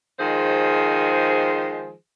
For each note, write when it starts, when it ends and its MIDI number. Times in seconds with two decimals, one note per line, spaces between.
0.19 1.93 51
0.19 1.93 53
0.19 1.93 56
0.19 1.93 68
0.19 1.93 72